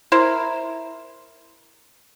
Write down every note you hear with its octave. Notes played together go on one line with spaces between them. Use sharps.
E4 A#4 C5